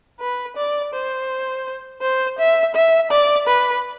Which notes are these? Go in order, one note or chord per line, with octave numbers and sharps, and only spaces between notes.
B4
D5
C5
C5
E5
E5
D5
B4